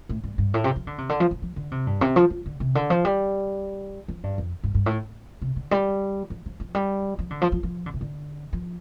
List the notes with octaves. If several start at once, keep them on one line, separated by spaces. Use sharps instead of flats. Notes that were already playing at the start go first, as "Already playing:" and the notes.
A2
G2
G2
A2
C3
F3
D3
C3
D3
F3
F3
F3
D3
C3
G2
C3
F3
F3
D3
C3
D3
F3
G3
F3
G2
F2
G2
G2
A2
C3
D3
G3
F3
F3
F3
G3
F3
D3
F3
F3
F3
D3
C3
D3
F3